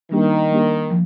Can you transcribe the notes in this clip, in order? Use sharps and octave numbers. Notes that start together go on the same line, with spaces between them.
D#3 G3 A#3 D4 G4
G3 A#3 D4 G4
F3